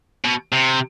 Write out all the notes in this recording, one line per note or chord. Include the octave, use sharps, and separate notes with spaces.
B2
C3